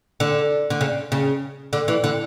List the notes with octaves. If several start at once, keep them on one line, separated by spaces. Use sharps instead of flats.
D3
D3
C#3
C#3
D3
E3
D3